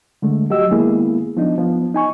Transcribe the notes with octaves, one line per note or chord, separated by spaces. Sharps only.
D3 G#3 A3
F#3 F#4 G4 D#5 E6
D#3 G#3 A#3 B3 E4 G#4
F3 B3 D4 D#4
F3 B3
D#4 G#5 C#6